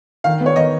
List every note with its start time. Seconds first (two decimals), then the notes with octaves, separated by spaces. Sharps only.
0.24 D#3 F5
0.40 B3
0.46 C#5
0.56 D#3 D#5